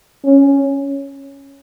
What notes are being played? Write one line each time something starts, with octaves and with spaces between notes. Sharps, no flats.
C#4